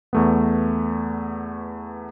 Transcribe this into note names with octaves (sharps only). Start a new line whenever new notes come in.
E2 A3 B3